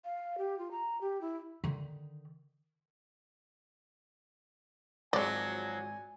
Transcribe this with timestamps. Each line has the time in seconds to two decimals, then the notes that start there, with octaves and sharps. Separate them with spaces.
0.04 F5
0.38 G4
0.58 F4
0.71 A#5
1.01 G4
1.21 E4
1.64 D3 D#3
5.13 G#1 F3 F#3 G#3 C4 D5 G#5 G7